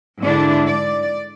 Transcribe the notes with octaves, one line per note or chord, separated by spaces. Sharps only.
G#2 D3 D4 E4
D5